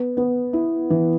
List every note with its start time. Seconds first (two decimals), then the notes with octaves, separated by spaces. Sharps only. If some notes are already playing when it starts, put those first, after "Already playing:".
Already playing: B3
0.17 B3
0.53 E4
0.90 E3